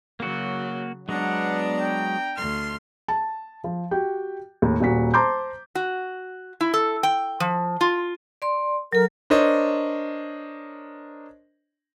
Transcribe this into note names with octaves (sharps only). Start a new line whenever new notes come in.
C#3 F#3 A#3 F#4
F#3 G#3 B3 D4 F#5 A#5
G5
D2 C6 F6
A5
F3
F#4 G4 G5
D#2 A2
D#1 A#2 F#4 B6
C5 A5 A#5 C6 D6 G6
F#4
E4
A4
G5
F3
F4
D5 C6
F#3 A4 A#4
D4 A#4 C5 C#5 D#5